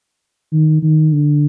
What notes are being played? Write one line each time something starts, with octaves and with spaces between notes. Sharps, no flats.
D#3
D#3
D3